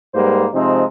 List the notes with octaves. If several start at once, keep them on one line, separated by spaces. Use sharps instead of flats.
G#2 G3 A#3 B4 C5
C3 F3 G#3 C4 D#4